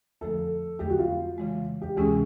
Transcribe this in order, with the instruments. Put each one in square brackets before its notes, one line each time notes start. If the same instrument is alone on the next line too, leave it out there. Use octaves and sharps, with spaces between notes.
[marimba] F2 D3 F3 A3 [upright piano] A4
[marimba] F2 D3 F#3 A3 [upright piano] G4
[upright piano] F#4
F4
[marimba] C#3 E3 G#3
[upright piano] G4
[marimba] D2 C3 E3 G#3 C#4 [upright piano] G#4